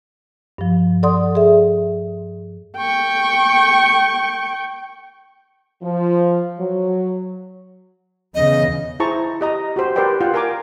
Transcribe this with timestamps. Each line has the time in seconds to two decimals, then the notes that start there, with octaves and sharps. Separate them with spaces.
0.58 G2 F3
1.03 A4 D5 F#5 C6 D#6
1.35 G#4 E5
2.78 G5 C#6
5.82 F3
6.59 F#3
8.35 E2 C#3 D#5
9.00 E4 G#4 C5 A5 A#5 C#6
9.41 G4 D#5 A#5
9.76 F#4 G4 C5
9.96 G4 A#4 B4 D5 G5 C6
10.21 F4 F#5 G5
10.34 A#4 F5 G#5 A#5 D6